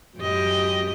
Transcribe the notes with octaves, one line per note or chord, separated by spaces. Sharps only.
F#2 G4 D#5